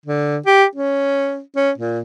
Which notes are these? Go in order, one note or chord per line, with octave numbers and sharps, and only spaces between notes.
D3
G4
C#4
C#4
A#2